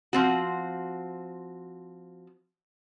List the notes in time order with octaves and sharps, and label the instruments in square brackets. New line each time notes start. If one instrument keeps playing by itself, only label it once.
[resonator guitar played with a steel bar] F3 C4 F#4